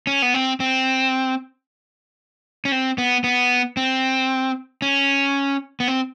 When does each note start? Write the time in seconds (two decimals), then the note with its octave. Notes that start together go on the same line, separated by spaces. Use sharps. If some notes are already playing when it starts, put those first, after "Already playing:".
0.07 C#4
0.22 B3
0.34 C4
0.60 C4
2.65 C#4
2.72 C4
2.98 B3
3.24 B3
3.77 C4
4.82 C#4
5.80 B3
5.88 C4